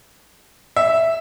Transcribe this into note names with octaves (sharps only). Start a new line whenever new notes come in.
E5